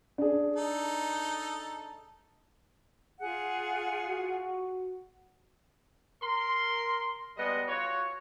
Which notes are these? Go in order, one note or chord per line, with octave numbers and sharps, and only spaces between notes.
D4 G#4
D#4 A4
F4 G#4 F#5
F#4
A#4 C6
G3 G#3 B3 D#5
F4 F#4 C#5